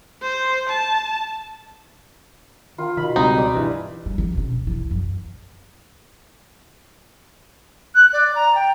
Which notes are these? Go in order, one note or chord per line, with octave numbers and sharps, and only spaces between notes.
C5
A5
D#3 F4
B2 D#3 B5
C#2 G3 C4 D#4
D5
G2 E3
G3
D#3 F3
B2 C#4
D#1
A#1 E3
F#2
F#6
D5
A#5
G5